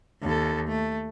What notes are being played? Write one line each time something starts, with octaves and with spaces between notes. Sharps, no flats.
D#2 A4
A3